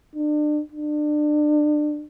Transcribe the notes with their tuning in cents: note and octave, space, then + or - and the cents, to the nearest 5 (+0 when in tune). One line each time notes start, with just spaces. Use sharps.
D4 +35
D4 +30